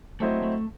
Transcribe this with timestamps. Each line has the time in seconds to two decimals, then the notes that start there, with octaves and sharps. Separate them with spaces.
0.20 F#3 A3 C4 E4 C5 D#5
0.42 A3